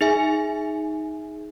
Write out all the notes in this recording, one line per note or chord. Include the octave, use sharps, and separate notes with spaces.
D#4 G#4 E5 G#5